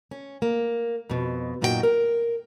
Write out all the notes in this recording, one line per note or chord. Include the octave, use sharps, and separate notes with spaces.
C#4
A#3
F2 B2
F#2 A#2 D#4 F#4 A#4 G5
A#4